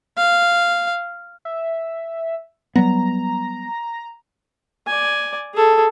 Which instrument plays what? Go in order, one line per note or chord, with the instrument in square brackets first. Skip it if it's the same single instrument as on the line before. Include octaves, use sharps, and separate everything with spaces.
[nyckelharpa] F5
[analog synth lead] E5
[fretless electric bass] F#3 G3 B3 [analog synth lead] A#5
[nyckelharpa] D5 G#5
G#4 A4